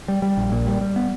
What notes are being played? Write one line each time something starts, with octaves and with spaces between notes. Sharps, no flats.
G3
G3
A#1
A#2
G3
G3
B3